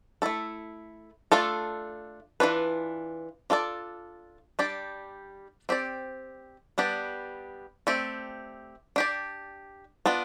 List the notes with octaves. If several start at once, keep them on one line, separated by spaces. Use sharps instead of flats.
A3 E4 A4
A3 D4 F4 A4
E3 B3 D4 F4 B4
D4 F4 A4 D5
G3 D4 G4 D5
C4 G4 D5
G3 B3 D4 G4
A3 C4 G4 D5
D4 G4 D5
B3 D4 F4